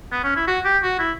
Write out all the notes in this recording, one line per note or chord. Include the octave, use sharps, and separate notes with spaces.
B3
C#4
E4
F#4
G4
F#4
E4